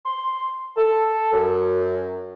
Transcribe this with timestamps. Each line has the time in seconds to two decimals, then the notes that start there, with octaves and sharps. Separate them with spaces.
0.05 C6
0.77 A4
1.32 F#2